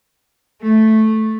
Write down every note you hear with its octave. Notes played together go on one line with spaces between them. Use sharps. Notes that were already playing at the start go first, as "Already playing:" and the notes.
A3